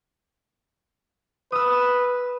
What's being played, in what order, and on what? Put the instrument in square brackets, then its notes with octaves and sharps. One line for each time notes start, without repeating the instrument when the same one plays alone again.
[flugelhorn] B4 [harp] D#6 E6